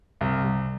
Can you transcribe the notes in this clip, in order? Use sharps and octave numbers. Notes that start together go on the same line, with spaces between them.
C2
C2